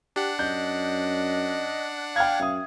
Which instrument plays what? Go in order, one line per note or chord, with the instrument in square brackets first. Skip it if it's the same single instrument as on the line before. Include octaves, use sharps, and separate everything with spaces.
[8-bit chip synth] D4 F#5 [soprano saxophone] G4
[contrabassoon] F#2 [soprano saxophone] D#5 [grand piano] G6
[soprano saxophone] F5 [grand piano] G5 F6 G#6
[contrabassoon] F#2 [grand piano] E5 D#6